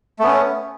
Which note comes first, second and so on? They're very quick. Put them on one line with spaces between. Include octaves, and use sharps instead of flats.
A3 B3 C#4